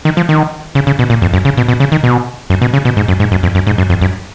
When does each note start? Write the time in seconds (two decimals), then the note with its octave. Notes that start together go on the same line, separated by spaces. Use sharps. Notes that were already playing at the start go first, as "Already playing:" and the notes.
0.05 D#3
0.17 F3
0.29 D#3
0.75 C#3
0.87 C#3
0.99 B2
1.10 A#2
1.22 F2
1.34 F#2
1.45 C#3
1.57 B2
1.68 B2
1.80 C#3
1.92 D#3
2.03 B2
2.50 F#2
2.62 B2
2.73 C#3
2.85 B2
2.97 G#2
3.08 F#2
3.20 G#2
3.31 F#2
3.43 F2
3.55 F#2
3.67 G#2
3.78 F#2
3.90 F2
4.01 F#2